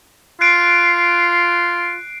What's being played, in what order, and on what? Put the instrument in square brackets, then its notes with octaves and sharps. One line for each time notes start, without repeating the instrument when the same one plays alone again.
[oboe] F4 [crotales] F#6 C7 D7